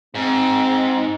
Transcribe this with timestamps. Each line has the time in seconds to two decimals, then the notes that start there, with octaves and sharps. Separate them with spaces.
0.15 G#2 C4